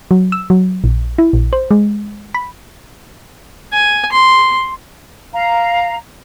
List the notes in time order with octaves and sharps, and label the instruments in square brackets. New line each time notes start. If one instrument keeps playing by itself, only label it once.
[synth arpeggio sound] F#3
E6
F#3
A#1
E4
A#1
C5
G#3
B5
[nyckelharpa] G#5
C6
[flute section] F5 A#5